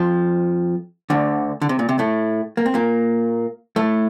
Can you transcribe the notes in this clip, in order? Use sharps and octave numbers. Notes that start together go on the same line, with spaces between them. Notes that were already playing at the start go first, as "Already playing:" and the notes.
Already playing: F2 F3
D2 D3
D3
C3
A#2
C3
A2 A3
A#3
C4
A#2 A#3
A2 A3